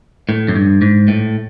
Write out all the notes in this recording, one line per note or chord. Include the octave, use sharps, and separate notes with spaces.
A2
F#2
G2
G#2
A2